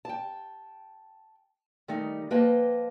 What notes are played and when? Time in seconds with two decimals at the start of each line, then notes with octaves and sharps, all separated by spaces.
0.05 G5 A5
1.88 D#3 G3 A3 D#4
2.30 F3 A#3 B4 D#5 G5 A5